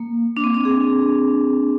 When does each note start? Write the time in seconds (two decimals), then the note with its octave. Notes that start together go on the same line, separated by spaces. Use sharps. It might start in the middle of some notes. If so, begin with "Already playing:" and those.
Already playing: A#3
0.37 D4
0.44 C4
0.54 D4
0.65 G#4